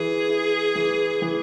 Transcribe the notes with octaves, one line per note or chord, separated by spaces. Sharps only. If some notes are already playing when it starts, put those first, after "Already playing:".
Already playing: E3 G#4
E4
E3
E3